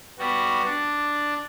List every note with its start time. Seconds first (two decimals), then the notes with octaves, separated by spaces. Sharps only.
0.19 G3 B3 F#4
0.65 D4